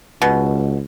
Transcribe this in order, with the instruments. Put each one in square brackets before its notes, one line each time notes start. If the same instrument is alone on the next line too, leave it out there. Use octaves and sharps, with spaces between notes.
[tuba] C#2 [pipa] B2